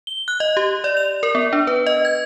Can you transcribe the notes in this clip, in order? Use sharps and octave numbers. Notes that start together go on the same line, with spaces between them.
G7
F#6
D#5
G4
D5
F7
A#4
B3
D4
B4
D#5
G#6